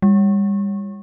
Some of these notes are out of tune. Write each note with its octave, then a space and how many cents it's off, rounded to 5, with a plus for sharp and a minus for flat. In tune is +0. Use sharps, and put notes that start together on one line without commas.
G3 +35